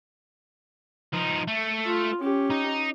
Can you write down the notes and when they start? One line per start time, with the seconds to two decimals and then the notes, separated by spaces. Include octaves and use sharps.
1.13 F3 D#4
1.48 A3
1.86 F4
2.20 C#4 G4
2.50 D#4